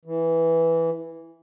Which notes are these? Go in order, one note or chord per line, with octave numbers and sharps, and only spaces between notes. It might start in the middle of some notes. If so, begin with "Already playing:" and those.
E3